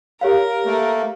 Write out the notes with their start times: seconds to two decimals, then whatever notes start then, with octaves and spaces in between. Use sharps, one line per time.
0.21 G4 A#4 C#5 F5
0.66 A3 A#3